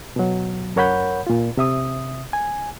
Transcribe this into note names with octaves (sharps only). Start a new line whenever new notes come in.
B2 F#3
F#2 A#4 C#5 F#5 B5 G6
A#2 F4
C3 E5 D#6
G#5